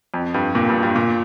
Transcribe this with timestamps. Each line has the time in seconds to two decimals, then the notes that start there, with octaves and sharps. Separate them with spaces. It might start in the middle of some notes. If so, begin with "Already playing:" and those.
0.14 F2
0.34 G2
0.55 A#2
0.69 G2
0.83 G2
0.96 A#2